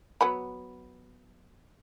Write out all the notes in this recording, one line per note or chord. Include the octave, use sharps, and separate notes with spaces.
F#3 B3 B5